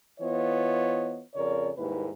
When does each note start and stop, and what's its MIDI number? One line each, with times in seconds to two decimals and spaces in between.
0.20 1.21 52
0.20 1.21 59
0.20 1.21 65
0.20 1.21 72
0.20 1.21 73
0.20 1.21 75
1.35 1.70 41
1.35 1.70 49
1.35 1.70 70
1.35 1.70 73
1.35 1.70 74
1.77 2.08 39
1.77 2.08 44
1.77 2.08 55
1.77 2.08 58
1.77 2.08 64
1.77 2.08 71